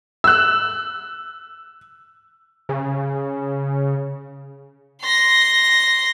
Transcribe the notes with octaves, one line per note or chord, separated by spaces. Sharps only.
E6 F#6
C#3
C6 A#6